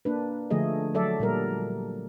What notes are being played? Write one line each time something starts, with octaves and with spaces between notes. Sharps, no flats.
A#3 D4 B4
D3 F3 A3 G#4 D#5
F#3 A4 D5 E5
A#2 G3 A#4